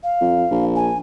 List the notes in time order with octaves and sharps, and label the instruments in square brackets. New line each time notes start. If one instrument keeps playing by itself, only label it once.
[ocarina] F5
[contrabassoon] F2
A#1
[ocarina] G#5